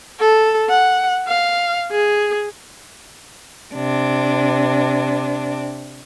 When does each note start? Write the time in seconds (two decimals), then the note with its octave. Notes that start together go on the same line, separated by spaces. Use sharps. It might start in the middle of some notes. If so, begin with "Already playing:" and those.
0.20 A4
0.69 F#5
1.28 F5
1.91 G#4
3.74 C3 D4